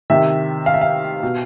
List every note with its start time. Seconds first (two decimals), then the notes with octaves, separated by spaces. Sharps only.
0.10 C3 D#3 E5
0.66 F5
0.74 E5
0.81 F5
1.23 B2